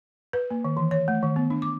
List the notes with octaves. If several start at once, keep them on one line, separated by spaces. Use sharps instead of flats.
B4
A#3
D#3
E3
C#5
A3
D#3
B3
D4
D6